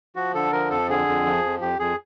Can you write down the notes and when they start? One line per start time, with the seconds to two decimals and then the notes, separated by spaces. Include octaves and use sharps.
0.16 F3 F#4
0.34 D3 A4
0.52 F3 A#4
0.70 F2 A4
0.89 D3 G#4
1.08 F2
1.26 F3
1.44 F2
1.61 F2 G4
1.79 F2 G#4